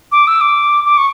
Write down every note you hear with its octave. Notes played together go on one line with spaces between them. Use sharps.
D6
E6
D6
D6
C#6